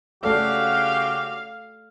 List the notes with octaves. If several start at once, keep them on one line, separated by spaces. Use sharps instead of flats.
C#3 A3 C#4 F#4 G4 A4 D5 F5